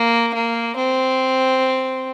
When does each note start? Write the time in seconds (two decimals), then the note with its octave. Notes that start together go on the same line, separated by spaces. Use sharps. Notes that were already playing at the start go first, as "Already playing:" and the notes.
Already playing: A#3
0.34 A#3
0.76 C4